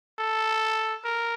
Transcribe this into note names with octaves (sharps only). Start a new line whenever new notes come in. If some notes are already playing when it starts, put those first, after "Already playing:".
A4
A#4